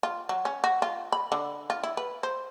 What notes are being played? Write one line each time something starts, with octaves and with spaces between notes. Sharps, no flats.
F4
F#3
C#4
F#4
F4
B5
D3
F4
E4
B4
C5